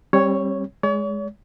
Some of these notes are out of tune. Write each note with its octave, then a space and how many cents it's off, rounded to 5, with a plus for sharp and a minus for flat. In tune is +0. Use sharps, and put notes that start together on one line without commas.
G3 +5 C4 +40 C#5 +0
G#3 +0 C#5 +40